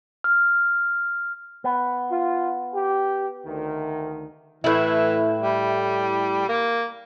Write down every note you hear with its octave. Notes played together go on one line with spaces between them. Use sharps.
F6
B3
F4
G4
D2 D#3
A2 E3 E4
G3
A#3